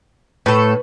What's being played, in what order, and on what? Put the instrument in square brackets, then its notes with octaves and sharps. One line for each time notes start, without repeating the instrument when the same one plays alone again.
[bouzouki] A2 A4 [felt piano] B4 C#6